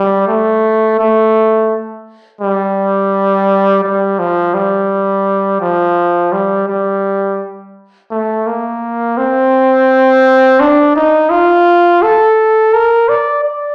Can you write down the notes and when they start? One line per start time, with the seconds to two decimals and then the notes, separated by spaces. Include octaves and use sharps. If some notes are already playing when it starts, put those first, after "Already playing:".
Already playing: G3
0.27 A3
0.99 A3
2.41 G3
3.84 G3
4.19 F3
4.54 G3
5.61 F3
6.32 G3
6.68 G3
8.11 A3
8.47 A#3
9.18 C4
10.60 D4
10.96 D#4
11.30 F4
12.02 A4
12.74 A#4
13.09 D5
13.44 D5